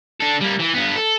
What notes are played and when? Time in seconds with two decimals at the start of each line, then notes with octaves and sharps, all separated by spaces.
0.20 D4 A4
0.41 G3 A#3
0.59 E3
0.74 G2 B3
0.95 A4